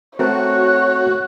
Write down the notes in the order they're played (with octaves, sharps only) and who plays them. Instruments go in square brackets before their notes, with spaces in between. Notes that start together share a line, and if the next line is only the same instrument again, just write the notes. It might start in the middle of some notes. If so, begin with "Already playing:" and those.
[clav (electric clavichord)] A3 C4 A#4 [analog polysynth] F#4 [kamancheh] C#5 [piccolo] F#6